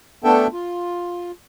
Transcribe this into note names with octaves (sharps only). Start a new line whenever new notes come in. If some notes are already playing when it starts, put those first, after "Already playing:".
A3 B3 D4 A4 E5 G5
F4